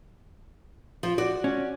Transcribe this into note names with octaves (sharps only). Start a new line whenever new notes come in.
F3
F#4 D5
C#4